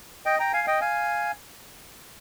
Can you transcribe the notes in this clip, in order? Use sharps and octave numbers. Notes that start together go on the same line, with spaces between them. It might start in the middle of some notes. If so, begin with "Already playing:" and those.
D#5 G5
G5 A#5
F5 G#5
D#5 G5
F5 G#5